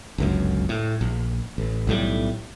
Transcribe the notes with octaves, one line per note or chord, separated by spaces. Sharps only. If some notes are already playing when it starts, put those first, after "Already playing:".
G1 C#2 F#2
A2
A#1
A1
B1 A2 G3